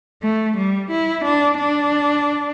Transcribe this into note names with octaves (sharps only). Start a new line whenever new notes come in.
A3
G3
E4
D4
D4